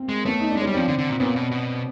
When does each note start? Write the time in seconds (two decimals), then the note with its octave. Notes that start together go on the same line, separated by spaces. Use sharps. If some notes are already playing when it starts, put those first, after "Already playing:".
Already playing: A#3 C4
0.09 G#3
0.25 A3 B3 C#4
0.40 D#4
0.51 D4
0.57 G#3
0.62 C#4
0.67 G3
0.73 F3 C4 D4
0.88 D3
0.98 D3
1.09 A#2
1.20 A#2 B3 C#4
1.36 B2
1.51 B2